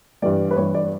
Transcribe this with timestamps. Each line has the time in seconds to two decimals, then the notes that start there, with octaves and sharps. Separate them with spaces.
0.22 G2 E3 G3 D5
0.51 B4
0.56 G2 E3 G3 C#5
0.75 D5